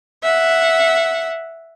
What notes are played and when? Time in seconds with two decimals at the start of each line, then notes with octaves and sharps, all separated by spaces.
0.23 E5 F#5